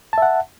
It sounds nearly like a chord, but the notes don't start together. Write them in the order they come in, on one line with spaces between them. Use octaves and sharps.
A5 E5 F#5